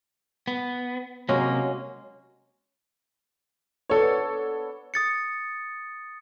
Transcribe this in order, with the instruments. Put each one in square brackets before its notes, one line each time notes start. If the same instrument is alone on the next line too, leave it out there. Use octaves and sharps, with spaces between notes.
[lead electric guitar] B3
[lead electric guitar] C3 A#3 [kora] F#3 G#3 C#4
[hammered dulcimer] B3 D4 [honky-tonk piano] A4 C#5
[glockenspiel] D#6 A6 C#7